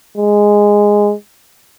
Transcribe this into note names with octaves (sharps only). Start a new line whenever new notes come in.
G#3